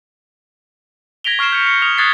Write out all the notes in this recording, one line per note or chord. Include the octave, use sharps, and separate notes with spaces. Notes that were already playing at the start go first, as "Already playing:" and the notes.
G#6 A#6 B6 D7 F7 G7
C#6 F6 C7 D7 E7
G6 C#7
C#7 F7
D#6 F6 F7
D#6 F#6 G#6 A6 B6 C7